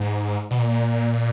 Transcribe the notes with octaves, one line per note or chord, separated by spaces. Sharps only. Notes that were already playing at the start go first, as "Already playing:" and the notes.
Already playing: G#2
B2
A#2